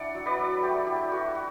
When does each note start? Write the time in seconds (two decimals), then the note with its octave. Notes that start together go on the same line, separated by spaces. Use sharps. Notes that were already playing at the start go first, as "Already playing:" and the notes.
Already playing: D4 E4 D5 F#5
0.14 F#3
0.26 B4 D5
0.38 F#3
0.62 A3 G4
0.86 E4 G4
1.12 A3 F#4
1.35 F#4